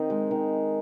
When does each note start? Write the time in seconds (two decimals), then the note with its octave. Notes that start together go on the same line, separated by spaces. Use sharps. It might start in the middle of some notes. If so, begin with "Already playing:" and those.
Already playing: D#3 C4 D#5
0.10 G#3
0.31 D#3